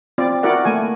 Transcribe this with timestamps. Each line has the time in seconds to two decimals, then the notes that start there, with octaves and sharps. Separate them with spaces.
0.18 C4 F4 D5
0.43 E4 F#4 A#4 D5 F#5
0.65 A3 A#3 G#5